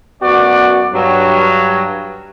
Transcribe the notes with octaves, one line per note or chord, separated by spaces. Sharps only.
F#2 B3 F#4 D5
G2 F#3